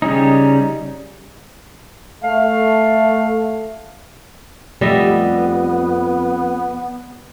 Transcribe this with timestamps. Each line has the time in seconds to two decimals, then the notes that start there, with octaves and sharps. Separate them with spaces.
0.02 C#3 G3 C#4 D#4
2.23 A3 F5
4.81 F2 F3 G3 A3 B3 D#5 E5